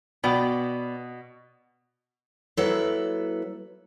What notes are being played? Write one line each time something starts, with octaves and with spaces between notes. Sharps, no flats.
B2 B3 D5 G5
F#3 A#3 E4 A4 B4 E5